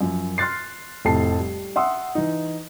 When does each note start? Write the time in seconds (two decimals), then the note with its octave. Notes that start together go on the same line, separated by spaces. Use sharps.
0.01 F#2 F3
0.38 C6 F6 F#6 A6 C7
1.05 F1 A2 C3 A5 C7
1.39 G3
1.76 E5 F#5 C6 D#6 E6
2.15 E3 D#4